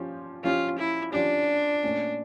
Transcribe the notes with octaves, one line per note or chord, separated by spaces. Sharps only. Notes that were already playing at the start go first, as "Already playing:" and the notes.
Already playing: F3 C#4 G4
F3 C#4 F4 G4
E4
F3 C#4 D4 G4
A#2 A3 C#4